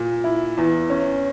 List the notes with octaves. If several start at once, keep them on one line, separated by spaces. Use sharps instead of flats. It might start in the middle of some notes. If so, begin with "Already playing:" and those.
Already playing: A#2
E4
E2
C#4